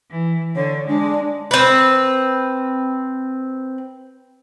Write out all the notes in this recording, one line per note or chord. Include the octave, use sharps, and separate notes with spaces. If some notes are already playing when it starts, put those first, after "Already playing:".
E3
D3 C#5
G#3 D4
C4 B4